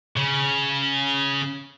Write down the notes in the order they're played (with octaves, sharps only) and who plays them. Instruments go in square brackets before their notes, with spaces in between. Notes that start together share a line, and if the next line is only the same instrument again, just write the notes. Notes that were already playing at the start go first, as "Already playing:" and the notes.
[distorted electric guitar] C#3